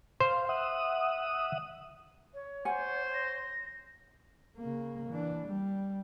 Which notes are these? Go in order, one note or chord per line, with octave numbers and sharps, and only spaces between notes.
C5 F5
E5 F#5 D#6
C#5
C5 F#5 G#5
A#6
C#3 A#3
E3 D4
G3